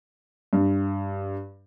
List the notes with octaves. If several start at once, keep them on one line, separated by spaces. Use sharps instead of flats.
G2